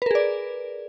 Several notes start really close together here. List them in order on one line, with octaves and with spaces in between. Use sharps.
B4 A#4 G#4 D5